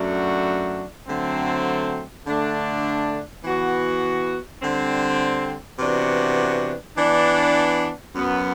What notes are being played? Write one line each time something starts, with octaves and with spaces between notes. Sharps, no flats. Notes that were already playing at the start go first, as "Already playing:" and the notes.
Already playing: F#2 F#3 A3 D4 F#4
D3 F#3 A3 C4
D3 A3 D4
E3 B3 F#4
D3 G3 C4
C3 E3 B3 D4 F#4
E3 B3 D4
F#2 F#3 B3